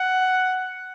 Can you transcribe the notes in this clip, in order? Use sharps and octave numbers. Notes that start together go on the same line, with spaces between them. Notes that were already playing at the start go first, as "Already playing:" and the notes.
Already playing: F#5